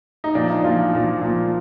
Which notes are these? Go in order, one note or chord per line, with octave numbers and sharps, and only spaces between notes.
D#4
A#2 F3 D4
D#4
A#2 F3 F4
A#2 F3
A#2 F3